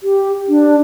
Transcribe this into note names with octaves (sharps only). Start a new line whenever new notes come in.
G4
D4